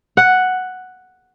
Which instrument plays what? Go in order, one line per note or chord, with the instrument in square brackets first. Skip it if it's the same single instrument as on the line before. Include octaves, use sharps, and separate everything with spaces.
[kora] F#5